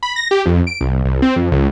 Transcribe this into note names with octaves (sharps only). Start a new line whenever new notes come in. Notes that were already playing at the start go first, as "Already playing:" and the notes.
B5
A#6
G4
F2
D7
C2
C2
C4
F2
C#2